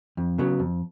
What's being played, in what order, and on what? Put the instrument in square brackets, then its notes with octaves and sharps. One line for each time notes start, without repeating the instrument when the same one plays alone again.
[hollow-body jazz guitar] F2
C#3 F#3 B3
F2